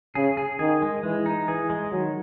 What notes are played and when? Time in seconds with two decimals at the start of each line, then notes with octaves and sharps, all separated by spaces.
0.15 C#3 G#4
0.37 G#4
0.59 D#3 G#4
0.82 G#3
1.03 E3 G#3
1.26 D#4
1.47 E3 G#4
1.70 G#3
1.91 D#3 F#3